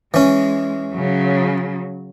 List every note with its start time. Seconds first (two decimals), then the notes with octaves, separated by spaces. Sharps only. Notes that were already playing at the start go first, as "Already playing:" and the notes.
0.14 E3 G#3 C#4
0.93 C#3 F#3